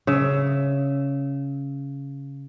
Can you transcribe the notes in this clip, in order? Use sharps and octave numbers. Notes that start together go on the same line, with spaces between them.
C#3 E5